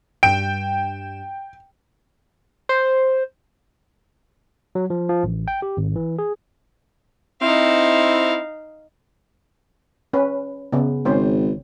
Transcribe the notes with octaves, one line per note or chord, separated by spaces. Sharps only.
G2 G5 D7 E7
C5
F#3
F3
F3
A1
G5
G4
G#1
E3
G#4
C4 D#4 E4 F5
C#4 B4
C#3 B3
G#1 C#4 C5